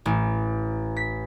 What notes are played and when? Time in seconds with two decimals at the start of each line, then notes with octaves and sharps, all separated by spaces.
0.06 A1
0.97 B6